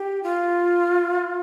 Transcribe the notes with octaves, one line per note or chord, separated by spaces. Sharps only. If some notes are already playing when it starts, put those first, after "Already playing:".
Already playing: G4
F4